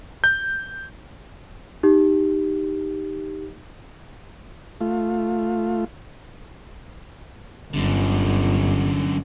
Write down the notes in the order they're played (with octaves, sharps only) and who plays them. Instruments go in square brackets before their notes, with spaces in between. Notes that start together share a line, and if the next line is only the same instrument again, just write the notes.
[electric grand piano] G6
[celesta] D#4 G4
[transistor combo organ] A3 F4
[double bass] G1 [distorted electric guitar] F#2 D3